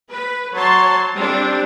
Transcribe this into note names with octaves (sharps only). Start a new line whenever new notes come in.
B4
F#3 C#5 A5 C6
G3 C4 D4